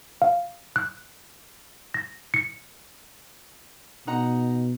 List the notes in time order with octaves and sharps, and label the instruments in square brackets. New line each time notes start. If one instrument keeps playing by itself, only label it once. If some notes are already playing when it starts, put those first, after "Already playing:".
[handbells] F5
F#6
A#6
C#7
[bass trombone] B2 [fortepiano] D#4 F#5 A#5